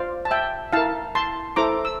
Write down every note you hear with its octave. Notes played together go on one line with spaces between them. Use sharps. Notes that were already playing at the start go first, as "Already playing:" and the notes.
Already playing: F4 C5 D5 F5
A5
E5 G5
E4 A#4 F5 A5
A5 C6
E4 A4 C5 A#5 D6
E6